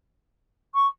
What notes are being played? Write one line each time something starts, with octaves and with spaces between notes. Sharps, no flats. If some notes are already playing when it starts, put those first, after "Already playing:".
C#6